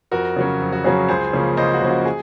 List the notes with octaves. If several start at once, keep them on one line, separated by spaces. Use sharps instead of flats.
F2 F#4 A#4
C#3 F#3 C#4
F2
F#4
C#3 F#3 C#4 G#4
C#2 G#4 C5
C#3 F3 A#3 C#4
C#2 C5 D#5
F#4
C#3 F3 A#3 C#4
F#4
G#4